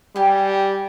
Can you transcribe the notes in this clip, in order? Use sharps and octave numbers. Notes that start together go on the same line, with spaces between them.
G3 G4 G#5